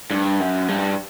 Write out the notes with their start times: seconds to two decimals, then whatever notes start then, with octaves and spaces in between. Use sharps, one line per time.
0.11 G2
0.40 F#2
0.68 G2